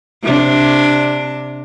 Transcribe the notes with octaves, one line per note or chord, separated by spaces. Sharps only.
C3 D4